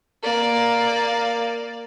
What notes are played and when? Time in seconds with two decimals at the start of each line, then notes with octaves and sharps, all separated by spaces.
0.23 A#3 D5